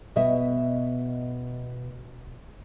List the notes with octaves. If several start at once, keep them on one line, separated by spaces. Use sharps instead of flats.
B2 D#5 E5